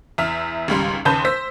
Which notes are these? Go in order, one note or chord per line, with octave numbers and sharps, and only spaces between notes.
E2 E5 F6
G#1 C#2 G3 C6
D#2 C#3 B4 A5 C6 G6
C5 E6 B6